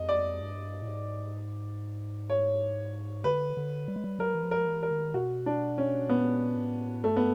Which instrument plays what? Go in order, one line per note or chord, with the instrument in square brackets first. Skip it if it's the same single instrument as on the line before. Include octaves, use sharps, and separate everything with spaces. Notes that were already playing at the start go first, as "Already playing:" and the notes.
Already playing: [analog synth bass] F2 [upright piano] D#5
[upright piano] D5
[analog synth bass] G2
A2
G#2
[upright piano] C#5
[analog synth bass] D3 [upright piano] B4
[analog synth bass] D3
G3
G#3
G3
[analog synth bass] F#3 [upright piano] A#4
[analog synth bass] E3
F3
[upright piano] A#4
[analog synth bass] E3
[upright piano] A#4
[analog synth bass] D#3
[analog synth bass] B2 [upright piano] F#4
[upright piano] D4
C#4
[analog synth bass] A#2 [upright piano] B3
[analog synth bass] A2
[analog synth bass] G2 [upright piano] A3
[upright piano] B3